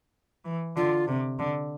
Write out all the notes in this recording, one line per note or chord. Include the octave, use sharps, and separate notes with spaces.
E3
D3 F4
C3
D3